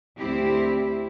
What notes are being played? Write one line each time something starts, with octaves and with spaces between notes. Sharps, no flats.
D2 C4 E4 G4